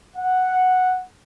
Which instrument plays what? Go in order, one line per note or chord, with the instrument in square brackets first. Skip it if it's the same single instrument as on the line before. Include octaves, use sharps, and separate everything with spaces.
[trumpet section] F#5